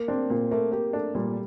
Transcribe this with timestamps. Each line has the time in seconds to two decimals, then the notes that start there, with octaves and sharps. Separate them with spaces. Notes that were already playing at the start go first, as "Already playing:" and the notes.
Already playing: A#3
0.08 C4 D4
0.30 A#2 A#3
0.51 A3 A#3
0.72 A#3 G4
0.93 A3 D4
1.15 A#2 G3